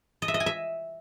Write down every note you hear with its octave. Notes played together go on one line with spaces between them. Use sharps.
D#5
E5
D#5
G#5
E5